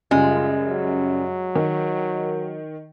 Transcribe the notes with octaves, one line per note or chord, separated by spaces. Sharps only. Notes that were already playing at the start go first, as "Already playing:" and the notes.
F#2 C#3 G3 G#3 F4
F#3
D#3